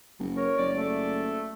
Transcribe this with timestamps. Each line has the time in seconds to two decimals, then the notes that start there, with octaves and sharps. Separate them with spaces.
0.19 F#1
0.37 A#4 C#5
0.58 F#1 D5
0.74 A3 D5